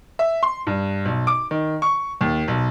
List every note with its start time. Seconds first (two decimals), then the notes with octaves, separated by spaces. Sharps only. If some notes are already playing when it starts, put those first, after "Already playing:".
0.19 E5
0.43 C6
0.67 G2
1.05 B1
1.27 D6
1.51 D#3
1.82 C#6
2.21 D#2
2.48 B1